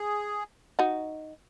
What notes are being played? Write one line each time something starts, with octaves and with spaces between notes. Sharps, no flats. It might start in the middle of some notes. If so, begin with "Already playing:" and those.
Already playing: G#4
D#4 F#4